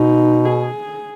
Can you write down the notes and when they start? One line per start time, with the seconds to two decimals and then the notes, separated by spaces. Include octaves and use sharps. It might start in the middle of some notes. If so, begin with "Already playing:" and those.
Already playing: B2 D#4
0.45 G#4